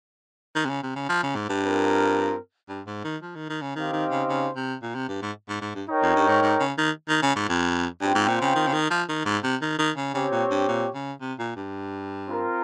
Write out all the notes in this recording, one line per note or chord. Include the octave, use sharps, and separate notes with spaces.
D#3
C3
C#3
C3
C#3
F3
C#3
G#2
G2
C4 F4 A#4
G2
G#2
D#3
F3
D#3
D#3
C#3
D#3 C4 D#4 G4 C5 F5
D#3
C#3
C#3
C3
A#2
C3
G2
G#2
G#2
G#2
G2
D#4 A#4 C#5 G5
F2
G2
G#2
G#2
C#3
D#3
D#3
C#3
G#2
F2
G2 C4 F4 C5 G5
G#2
A#2
C#3
D#3
C#3
D#3
F3
D#3
G#2
C3
D#3
D#3
C#3
C#3 C4 G4 C#5
A#2
G2
A#2
C#3
C3
A#2
G2
C4 F4 A#4